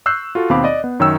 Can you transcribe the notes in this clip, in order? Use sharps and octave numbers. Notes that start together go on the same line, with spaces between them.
C#6 E6 F#6 G6 C7
F4 F#4 A4
D#2 B2 C4 F5 B5 D6
D5 D#5
B3
F#2 D#3 C#5 G5 E6